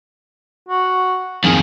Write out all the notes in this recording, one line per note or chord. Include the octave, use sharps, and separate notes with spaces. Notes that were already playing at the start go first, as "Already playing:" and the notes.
F#4
F2 D#3 G#4